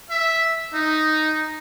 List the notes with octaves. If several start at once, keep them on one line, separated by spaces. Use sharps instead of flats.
E5
D#4